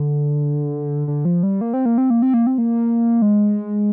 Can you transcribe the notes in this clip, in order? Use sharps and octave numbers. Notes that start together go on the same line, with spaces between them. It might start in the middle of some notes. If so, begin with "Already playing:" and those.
Already playing: D3
D3
F3
G3
A#3
C4
A#3
C4
A#3
C4
A#3
C4
A#3
G#3